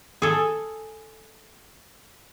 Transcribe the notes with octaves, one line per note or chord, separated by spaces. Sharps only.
G#4 A4